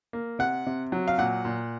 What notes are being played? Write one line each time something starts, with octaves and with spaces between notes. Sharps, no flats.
A#3
C3 F#5
C3
F#3
F5
A#2 F#5
A#2